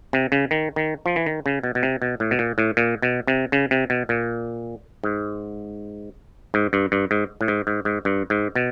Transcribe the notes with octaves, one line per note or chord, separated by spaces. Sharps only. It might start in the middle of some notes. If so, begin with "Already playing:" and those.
C3
C#3
D#3
D#3
F3
E3
D#3
C#3
B2
B2
C3
B2
A2
B2
A#2
A2
A#2
B2
C3
C#3
C3
B2
A#2
G#2
G#2
G2
G2
G#2
A2
G#2
G#2
G#2
G2
G#2
B2